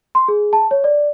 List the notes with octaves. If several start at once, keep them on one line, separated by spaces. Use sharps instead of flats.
C6
G#4
A5
C#5
D5